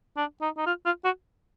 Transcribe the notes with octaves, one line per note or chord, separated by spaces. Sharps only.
D4
D#4
D#4
F4
F4
F#4